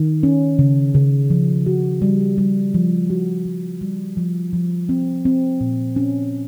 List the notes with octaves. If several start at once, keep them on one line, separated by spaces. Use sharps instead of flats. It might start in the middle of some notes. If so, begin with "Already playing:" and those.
Already playing: D#3
C#4
C#3
C#3
F3
F#4
G3
G3
F3
F#4
G3
G3
F3
F3
C4
C4
A#2
C#4